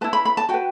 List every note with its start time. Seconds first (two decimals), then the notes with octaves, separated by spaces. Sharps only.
0.01 E4 B4 A5
0.13 B5
0.25 B5
0.37 A5
0.49 F#4 B4 G5